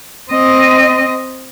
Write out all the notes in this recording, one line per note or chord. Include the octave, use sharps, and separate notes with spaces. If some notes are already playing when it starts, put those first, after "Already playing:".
C4 D#5